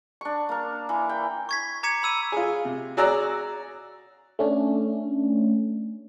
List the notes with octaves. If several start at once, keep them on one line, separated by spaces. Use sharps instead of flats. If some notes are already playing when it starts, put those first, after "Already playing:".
D4 C#6
A#3 A#4
E3
G5
C#6 G#6 B6
A#5 D6 G#6 B6 C#7 E7
B5 E6 D#7
F4 G#4
C3
F#4 G#4 D5 A#5 E6 F#6
A3 C#4 D4